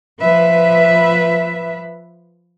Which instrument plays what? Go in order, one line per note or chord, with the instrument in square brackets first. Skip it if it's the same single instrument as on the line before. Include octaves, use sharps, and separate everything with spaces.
[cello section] F3 B4 E5